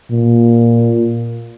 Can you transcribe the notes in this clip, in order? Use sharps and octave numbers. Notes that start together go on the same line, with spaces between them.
A#2